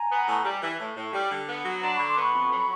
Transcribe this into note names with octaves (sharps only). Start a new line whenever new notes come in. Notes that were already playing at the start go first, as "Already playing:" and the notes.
Already playing: G#5 A#5
B3
A2
G3
E3
A2
A2
G3
D3
B3
F#3
D4 A#5 C6
D3 B5 C#6
C6 D6
B3 B5 C#6
F2
F#3